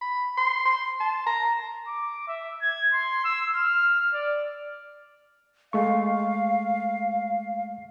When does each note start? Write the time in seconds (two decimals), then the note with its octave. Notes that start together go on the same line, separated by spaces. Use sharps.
0.01 B5
0.37 C6
0.65 C6
1.00 A5
1.27 A#5
1.88 D6
2.28 E5
2.62 G#6
2.93 C6
3.24 E6
3.55 F6
4.13 D5
5.73 G#3 A3 F5 C#6